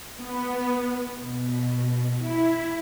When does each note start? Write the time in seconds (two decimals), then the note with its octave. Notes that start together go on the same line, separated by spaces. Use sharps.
0.20 B3
1.21 B2
2.25 E4